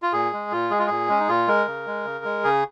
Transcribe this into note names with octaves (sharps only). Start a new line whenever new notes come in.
F4
A#2 G#4
G#3
A#2 F4
G#3 G#4
F4
A#2 G#4
G#3 C#4
D#4
A#2 F4
G#3 A#4
C#3
G#3
C#3
G#3
C#3 G#4